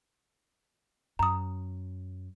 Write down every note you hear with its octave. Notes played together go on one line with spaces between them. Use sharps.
F#2 A#5 D#6